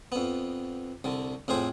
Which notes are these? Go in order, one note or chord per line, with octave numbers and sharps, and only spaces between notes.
F2 B3
C2 D3
F2 A2 G#4 C5